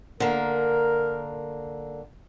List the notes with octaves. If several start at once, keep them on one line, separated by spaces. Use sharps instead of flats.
D3 A#3 A#4